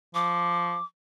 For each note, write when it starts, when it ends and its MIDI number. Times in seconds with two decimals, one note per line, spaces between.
0.15 0.78 53
0.15 0.85 86